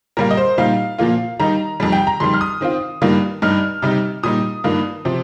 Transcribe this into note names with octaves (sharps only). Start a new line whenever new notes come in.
A#2 G3 A#3 F4 A#4
D#5
C5
A#2 G3 D#4 F5
A#2 F3 A#3 F4
D#3 G3 D#4 A#5
F2 D#3 G3
G5
A#5
F2 D#3 G3 C6
F6
D#6
D#3 C4 F4
G2 D#3 G3 A#3 F4
G2 G3 D#4 F6
C3 G3 D#4
A#2 G3 D#4 D#6
G2 D#3 A#3 F4
C3 F3 C4